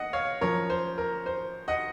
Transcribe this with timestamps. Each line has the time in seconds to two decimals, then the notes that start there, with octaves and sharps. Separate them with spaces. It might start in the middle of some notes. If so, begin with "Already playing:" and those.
Already playing: D#5 F#5
0.13 C#5 F5
0.41 F#2 F3 A#4 C#5
0.70 C5
0.98 A#4
1.26 C5
1.68 D#5 F#5